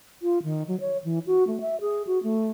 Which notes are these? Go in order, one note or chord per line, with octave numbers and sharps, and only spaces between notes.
F4
D#3
F#3
C#5
E3
F#4
A3
E5
G#4
F#4
A3